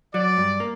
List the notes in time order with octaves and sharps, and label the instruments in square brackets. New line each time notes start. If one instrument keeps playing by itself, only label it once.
[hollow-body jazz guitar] F#3 [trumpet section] D5
[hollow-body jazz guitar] G2
A#3